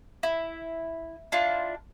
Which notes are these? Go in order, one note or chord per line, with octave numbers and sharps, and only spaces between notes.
E4
D4 E4 F4